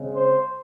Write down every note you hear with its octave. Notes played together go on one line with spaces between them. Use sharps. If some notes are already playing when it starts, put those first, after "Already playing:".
Already playing: C#3 G#3 C4
C5